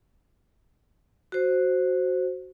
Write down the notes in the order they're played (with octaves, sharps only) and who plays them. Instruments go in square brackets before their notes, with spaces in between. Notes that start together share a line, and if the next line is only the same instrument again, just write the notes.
[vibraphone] F#4 C5